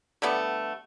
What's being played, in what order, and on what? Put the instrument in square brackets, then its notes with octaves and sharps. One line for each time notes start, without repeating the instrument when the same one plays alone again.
[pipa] D3 G3 A3 B3